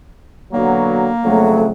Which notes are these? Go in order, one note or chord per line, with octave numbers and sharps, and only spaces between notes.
B2 D3 F#3 A#3
F2 C#3 F#3 A3